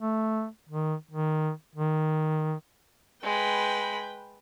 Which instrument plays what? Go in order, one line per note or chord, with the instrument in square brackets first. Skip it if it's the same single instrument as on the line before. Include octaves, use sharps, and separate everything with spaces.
[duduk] A3
D#3
D#3
D#3
[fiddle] G#3 B5 [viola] B4 G5